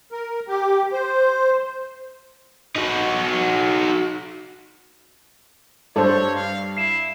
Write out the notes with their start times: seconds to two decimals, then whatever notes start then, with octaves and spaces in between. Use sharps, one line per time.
0.12 A#4
0.48 G4
0.93 C5
2.76 D#4 F#4
5.96 G2 D4 A4 C5 C#5 A5
6.36 F5
6.77 E4 C7 E7